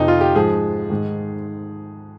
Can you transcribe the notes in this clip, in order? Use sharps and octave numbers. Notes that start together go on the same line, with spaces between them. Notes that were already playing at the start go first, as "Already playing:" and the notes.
Already playing: F2 C3 F3 D#4
F4
G4
G#2 F3 G#4
G#2 D#3